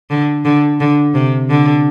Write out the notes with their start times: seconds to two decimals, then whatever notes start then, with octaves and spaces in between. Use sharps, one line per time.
0.10 D3
0.45 D3
0.81 D3
1.14 C3
1.50 D3